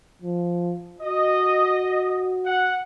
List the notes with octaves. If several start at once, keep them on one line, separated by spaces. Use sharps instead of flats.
F3
F#4 D#5
F#5